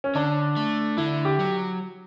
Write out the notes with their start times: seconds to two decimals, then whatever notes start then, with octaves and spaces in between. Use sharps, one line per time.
0.04 C#4
0.15 D3 D4
0.56 A3
0.97 D3 E4
1.25 G4
1.40 F#3